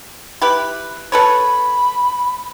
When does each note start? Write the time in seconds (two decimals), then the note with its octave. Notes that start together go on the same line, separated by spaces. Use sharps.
0.42 E4 G4 B4
1.12 A4 B4 C#5 B5